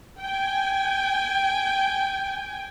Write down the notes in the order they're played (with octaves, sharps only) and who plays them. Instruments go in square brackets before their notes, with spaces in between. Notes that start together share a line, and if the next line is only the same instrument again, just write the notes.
[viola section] G5 G#5